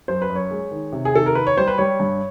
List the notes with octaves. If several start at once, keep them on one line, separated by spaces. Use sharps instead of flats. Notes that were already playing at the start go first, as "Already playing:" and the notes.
F#2 C5
B4
F#2
C#5
G#3
D#3
C3
G#4
D#3 A4
A#4
D#3 B4
C#5
G3 C5
B4
G3 C#5
G2